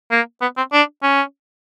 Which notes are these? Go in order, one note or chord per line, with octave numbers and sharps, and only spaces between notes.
A#3
B3
C4
D4
C#4